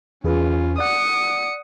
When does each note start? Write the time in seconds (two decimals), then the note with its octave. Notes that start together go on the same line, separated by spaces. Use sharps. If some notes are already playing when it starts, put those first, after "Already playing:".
0.24 E2 C#4 F4 G#4 B4
0.78 D5 F#5 D#6 C#7